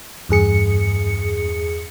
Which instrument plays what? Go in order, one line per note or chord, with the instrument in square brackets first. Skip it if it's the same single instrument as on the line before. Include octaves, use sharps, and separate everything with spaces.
[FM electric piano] E2 G2 G#4 C#7